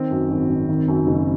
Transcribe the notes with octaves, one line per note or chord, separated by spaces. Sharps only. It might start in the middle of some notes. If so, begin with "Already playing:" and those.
Already playing: D#3 C4
F#2
G#1
G#1
D#3
F#2
F#1